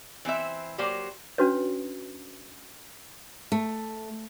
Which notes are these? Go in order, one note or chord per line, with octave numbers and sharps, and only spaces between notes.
E3 C4 C5 E5
F#3 A#3 G4 C5 D5
C#4 D4 F#4 B4 C#5
A3